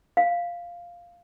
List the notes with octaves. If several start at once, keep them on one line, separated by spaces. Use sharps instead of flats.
F5